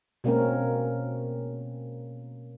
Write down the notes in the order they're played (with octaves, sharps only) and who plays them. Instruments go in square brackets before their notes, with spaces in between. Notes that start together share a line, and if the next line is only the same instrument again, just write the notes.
[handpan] B2 G#3 A#3 C4 C#4 A#4